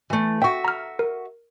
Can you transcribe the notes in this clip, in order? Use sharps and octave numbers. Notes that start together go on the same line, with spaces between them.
E3 A3
F#4 E5 G5 C#6
A#5 F6
A#4